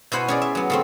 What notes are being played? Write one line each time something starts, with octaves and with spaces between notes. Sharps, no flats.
B2 E4 C5 F#5 G#5 B5
C#4 G#4 D5
E5
F#3 B3
C#3 A3 C4